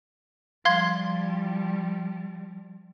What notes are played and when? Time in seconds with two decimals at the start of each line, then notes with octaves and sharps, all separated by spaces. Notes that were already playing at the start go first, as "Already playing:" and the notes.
0.65 F3 G3 F5 C6 G#6